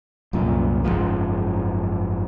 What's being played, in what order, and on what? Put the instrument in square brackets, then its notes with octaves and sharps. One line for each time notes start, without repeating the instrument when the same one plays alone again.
[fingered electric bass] C2 F#2 A#2
F#1 C#2 G#2 F3